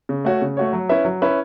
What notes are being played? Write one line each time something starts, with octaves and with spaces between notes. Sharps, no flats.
C#3
A3 F#4 C#5
C#3
A3 F#4 C#5
F#3
C#4 E4 B4 E5
F#3
C#4 E4 B4 E5